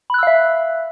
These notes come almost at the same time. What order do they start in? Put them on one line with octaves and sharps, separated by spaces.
B5 F#6 E6 F5 E5